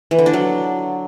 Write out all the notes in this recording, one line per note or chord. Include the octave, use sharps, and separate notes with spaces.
E3
D3
D4
F#3